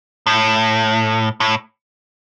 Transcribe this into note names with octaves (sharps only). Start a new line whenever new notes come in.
A2
A2